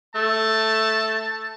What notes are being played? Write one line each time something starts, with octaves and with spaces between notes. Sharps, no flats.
A3 A5